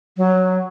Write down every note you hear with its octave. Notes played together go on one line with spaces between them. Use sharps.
F#3